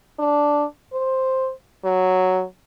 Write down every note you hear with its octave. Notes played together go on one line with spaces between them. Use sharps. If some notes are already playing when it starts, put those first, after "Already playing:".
D4
C5
F#3